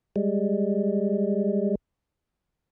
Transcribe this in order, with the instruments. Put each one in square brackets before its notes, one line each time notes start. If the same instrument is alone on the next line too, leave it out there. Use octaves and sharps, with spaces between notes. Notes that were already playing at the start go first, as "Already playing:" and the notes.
[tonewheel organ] G3 G#3